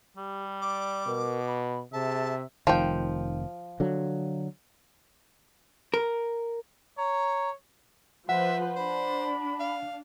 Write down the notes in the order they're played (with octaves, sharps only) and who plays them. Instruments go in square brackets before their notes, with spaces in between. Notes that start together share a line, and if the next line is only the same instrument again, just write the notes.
[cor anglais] G3 [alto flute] G4
[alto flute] D5 [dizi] D6
[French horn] B2 [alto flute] A#4
[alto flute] B5
[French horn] C3 [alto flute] G#4 [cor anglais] E5 [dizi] A5
[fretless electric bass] F1 D#3 [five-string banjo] F3 G5
[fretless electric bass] D3 F#3
[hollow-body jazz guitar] A#4
[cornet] C#5 [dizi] A#5
[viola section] F3 B4 C5 [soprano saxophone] E5 [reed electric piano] F#5
[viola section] D4 [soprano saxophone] C5 [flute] B5
[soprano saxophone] F5